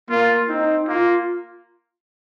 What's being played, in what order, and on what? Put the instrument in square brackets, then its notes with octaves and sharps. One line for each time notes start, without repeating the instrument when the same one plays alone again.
[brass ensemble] A#3 [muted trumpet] F4
[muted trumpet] C4 [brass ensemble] D#4
[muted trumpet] A#3 [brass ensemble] F4